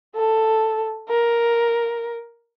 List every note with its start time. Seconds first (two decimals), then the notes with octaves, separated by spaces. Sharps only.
0.15 A4
1.09 A#4